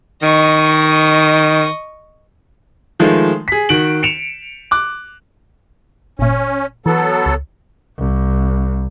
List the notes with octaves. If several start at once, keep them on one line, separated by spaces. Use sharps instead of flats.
D#3 D#5 C#6
D#3 F3 G#3 A3
G#4 B6
D#3 F#4 D7 F#7
C#7 D7 E7 F7
D6 F#6
G1 A#2 C#4
E3 F#3 B3 A4
C#2
C2